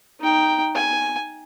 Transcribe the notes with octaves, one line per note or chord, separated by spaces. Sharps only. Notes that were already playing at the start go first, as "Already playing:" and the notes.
D#4 G5
G#5